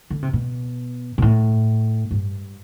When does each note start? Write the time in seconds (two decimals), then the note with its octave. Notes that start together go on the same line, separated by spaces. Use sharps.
0.10 D3
0.23 C3
0.33 B2
1.18 B2
1.22 A2
2.11 G2